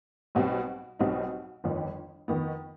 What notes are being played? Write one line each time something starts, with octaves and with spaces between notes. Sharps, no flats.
B1 B2 G3 C4
B1 B2 G3 C4 D#4
G1 F2 D#3
F2 D#3 B3